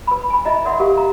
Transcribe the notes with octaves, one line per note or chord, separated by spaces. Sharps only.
B4 B5
G#5 B5
E4 D#5 E5 A#5
A#4 D5 E5 F#5 C6
G4 A#4 F5
A#5